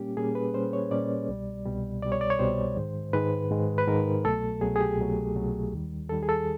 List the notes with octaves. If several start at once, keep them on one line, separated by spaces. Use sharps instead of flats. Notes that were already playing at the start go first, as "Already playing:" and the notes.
Already playing: A#2 G3 A#3 C#4 G4
A#2 G3 A#3 C#4 G#4
B4
A#2 G3 A#3 C#4 C5
C#5
A#2 G3 A#3 C#4 D5
C2 B2 G3
C2 B2 G3
C2 B2 G3 D5
C#5
D5
C#5
C2 B2 G3 C5
G#2 D#3 G#3
G#2 D#3 G#3 B4
G#2 D#3 G#3
B4
G#2 D#3 G#3 A#4
C2 B2 F#3 A3 A4
C2 B2 F#3 A3 G#4
G#4
G4
C2 B2 F#3 A3
C2 B2 F#3 A3
D#2 D#3 G3
D#2 D#3 G3 A4
G#4
A4